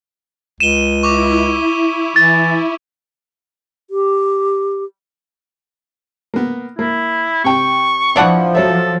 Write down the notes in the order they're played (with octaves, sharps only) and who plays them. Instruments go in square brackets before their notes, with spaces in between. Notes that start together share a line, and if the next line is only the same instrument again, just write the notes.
[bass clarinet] C#2 [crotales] D#7 G7 [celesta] E7
[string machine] E4 [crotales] C#6 D6
[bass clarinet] E3 [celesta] A6
[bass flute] G4
[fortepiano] A#3 B3
[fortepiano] A#3 [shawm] E4
[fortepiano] C3 G5 [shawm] C#6
[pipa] E3 D4 F#5 [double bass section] F3
[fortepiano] F#3 C#5 E5 [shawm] A4